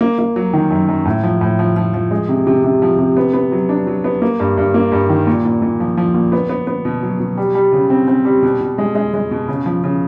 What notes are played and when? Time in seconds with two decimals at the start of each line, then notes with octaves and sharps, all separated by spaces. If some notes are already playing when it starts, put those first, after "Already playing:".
0.01 A#3
0.19 A#3
0.36 F#3
0.53 D#3
0.71 F#2
0.89 F#2
1.05 A2
1.24 F3
1.41 A2
1.59 F3
1.76 F3
1.94 F3
2.11 G#3
2.29 C3
2.47 C3
2.64 C3
2.82 F3
2.99 C3
3.17 B3
3.33 B3
3.52 F#3
3.69 D4
3.87 F#3
4.04 B3
4.22 A#3
4.40 G2
4.57 G2
4.74 A#3
4.92 G2
5.10 D#3
5.27 A#2
5.45 A#2
5.62 A#2
5.80 F3
5.97 F3
6.14 A#2
6.32 B3
6.49 B3
6.67 B3
6.85 B2
7.03 F#3
7.20 B2
7.37 G3
7.55 G3
7.73 C#3
7.90 C4
8.08 C4
8.25 G3
8.42 B2
8.61 B2
8.78 G#3
8.95 G#3
9.14 G#3
9.31 B2
9.48 C#3
9.66 F3
9.84 C#3